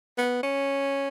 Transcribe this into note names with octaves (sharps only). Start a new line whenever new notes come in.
B3
C#4